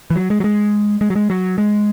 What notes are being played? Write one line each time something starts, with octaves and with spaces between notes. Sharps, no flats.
E3
F#3
G#3
F#3
G#3
G#3
F#3
G#3
F#3
G#3